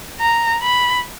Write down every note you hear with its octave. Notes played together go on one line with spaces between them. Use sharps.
A#5
B5